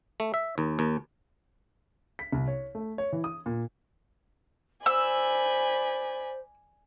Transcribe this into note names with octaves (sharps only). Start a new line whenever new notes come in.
A3
E5
D#2
D#2
B6
C2
C#5
A3
C#5
E3
D#6
A#2
C5 D5 G#5 B5 E6